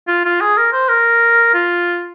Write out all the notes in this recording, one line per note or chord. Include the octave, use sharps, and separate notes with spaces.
F4
F4
G#4
A#4
C5
A#4
F4